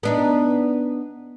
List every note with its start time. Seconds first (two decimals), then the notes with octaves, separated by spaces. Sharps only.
0.03 B3 D4 D#4